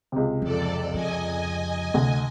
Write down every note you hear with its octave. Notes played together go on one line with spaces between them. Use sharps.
C#2 C3
F2 E3 C4 A4 D5
F2 F3 D#5 G#5
D2 C3 E3